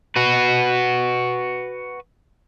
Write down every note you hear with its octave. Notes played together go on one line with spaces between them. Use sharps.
F#4 B4